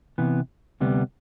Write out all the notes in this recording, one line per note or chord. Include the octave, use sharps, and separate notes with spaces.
C3 E3 B3
D2 C3 G3 B3